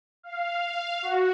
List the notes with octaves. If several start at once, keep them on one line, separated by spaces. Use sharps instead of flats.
F5
F#4